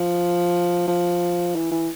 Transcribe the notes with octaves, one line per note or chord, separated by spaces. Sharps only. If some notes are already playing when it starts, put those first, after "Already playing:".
Already playing: F3
F3
E3
E3